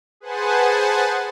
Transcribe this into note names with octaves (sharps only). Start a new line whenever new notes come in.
G#4 B4 C5 F#5 G#5 A5